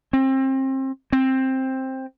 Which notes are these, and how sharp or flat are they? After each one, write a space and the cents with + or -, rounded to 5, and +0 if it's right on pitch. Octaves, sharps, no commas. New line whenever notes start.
C4 +30
C4 +10